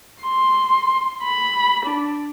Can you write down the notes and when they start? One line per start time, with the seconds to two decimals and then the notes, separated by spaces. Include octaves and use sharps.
0.22 C6
1.23 B5
1.86 D4